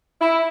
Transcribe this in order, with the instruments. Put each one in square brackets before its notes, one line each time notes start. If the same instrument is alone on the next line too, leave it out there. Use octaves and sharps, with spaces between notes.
[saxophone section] E4